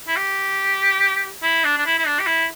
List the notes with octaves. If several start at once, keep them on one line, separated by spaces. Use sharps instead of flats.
E4
G4
E4
D4
D4
E4
E4
D4
G4
E4